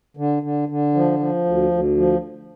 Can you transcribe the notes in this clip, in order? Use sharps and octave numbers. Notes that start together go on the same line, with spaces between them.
D3
D3
D3
F3
F3
D2
D2
F3